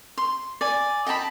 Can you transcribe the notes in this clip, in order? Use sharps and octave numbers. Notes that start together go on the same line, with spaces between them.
C6
D5 G#5
D#5 G5 A5 B5